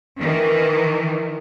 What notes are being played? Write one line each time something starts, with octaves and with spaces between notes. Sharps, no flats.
D#3 E3